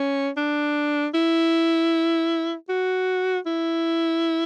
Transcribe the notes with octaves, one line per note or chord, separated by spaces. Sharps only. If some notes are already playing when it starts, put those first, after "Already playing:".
Already playing: C#4
D4
E4
F#4
E4